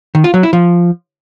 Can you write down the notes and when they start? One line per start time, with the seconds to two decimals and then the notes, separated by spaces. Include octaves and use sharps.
0.15 D#3
0.24 F4
0.34 F#3
0.43 E4
0.53 F3